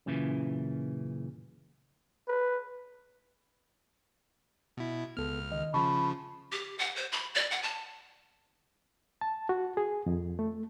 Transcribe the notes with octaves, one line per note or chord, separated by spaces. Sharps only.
F#2 A#2 C#3 E3
B4
B2 E4
C#2 B3 A4 F6
D#3 D#5
C#3 F3 A5 B5 C#6
G4
F#5
C5
B5
D5
F#5
A5
A5
F#4
G#4
F2
A3